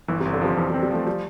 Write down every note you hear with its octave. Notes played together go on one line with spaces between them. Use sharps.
G1 E3
C3
G1
D3
C3 F3
F2 E3
G3
C4
G3
F3 A3
G3